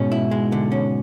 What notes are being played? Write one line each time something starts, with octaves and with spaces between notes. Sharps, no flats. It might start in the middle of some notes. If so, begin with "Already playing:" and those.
Already playing: G#2 B2 C#4
E4
G#3
D3
C#4